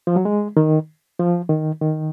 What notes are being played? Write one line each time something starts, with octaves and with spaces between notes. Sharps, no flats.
F3
F#3
G#3
D#3
F3
D#3
D#3